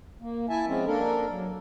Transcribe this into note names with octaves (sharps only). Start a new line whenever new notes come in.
A#3
E4 E5 G#5 A5
F3 G#3 C4 C#4
A#3 D4 A4 A#4
F#3